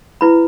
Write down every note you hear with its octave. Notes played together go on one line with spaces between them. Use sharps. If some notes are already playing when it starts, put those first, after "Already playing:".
E4 B4 B5